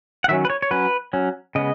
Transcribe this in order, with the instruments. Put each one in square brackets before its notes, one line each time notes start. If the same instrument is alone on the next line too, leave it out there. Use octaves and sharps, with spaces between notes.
[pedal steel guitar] F#5
D#3 F#3 C#4 E5
B4
C#5
C#5
F#3 C#4 B4
F#3 C#4
C#3 G#3 B3 D#5